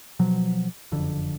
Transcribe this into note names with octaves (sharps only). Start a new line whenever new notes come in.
B2 F3 F#3
F#1 F2 D3